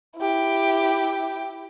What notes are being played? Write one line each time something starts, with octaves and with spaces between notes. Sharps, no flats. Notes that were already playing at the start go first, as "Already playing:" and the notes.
E4 G4